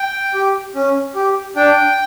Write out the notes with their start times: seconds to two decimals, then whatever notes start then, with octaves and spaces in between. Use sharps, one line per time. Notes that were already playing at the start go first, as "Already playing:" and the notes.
Already playing: G5
0.34 G4
0.75 C#4
1.15 G4
1.56 D4 G5